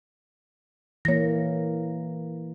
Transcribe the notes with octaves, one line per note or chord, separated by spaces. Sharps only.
E3 A#3 C#5 A#6